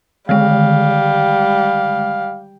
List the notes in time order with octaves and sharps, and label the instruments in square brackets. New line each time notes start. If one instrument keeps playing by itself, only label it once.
[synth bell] D3 D#3 G#3 [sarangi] G3 [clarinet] F5